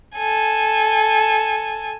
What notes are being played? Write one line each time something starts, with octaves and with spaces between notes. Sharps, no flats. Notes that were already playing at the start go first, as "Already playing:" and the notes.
A4 G#5